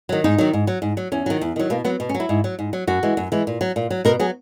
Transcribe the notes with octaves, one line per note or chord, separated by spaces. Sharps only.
D#3 F#3
G#2 D#4
D#3 F#3
G#2
F#3
G#2
F#3
E2 C#4
D#3 F#3
E2
D#3 F#3
B2 A#3
F#3 B3
B2
C#4
F#3
E4
G#2
F#3
G#2
F#3
F#2 F#4
E3 G#3
F#2
E3 G#3
A#2
F#3
A#2
F#3
B2 A#4
F#3 G#4